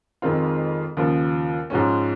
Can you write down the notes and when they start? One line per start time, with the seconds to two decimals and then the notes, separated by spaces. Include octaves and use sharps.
0.22 F2 D#3 G#3 C4 F4
0.97 D#2 C#3 F3
1.70 G#2 F3 G#3 C#4